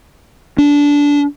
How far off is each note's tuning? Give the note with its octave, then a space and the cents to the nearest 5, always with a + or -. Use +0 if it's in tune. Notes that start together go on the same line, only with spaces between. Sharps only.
D4 -20